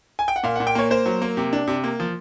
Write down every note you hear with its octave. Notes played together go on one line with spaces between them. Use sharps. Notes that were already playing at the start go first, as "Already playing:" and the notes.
G#5
G5
F#5
A#2 F5
F#5
A#2
G5
A#3 C#5
A#3 C5
F#3
A#3
C3
D4
C3
A#3
F3